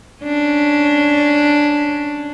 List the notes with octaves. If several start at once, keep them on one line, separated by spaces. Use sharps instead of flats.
C#4 D4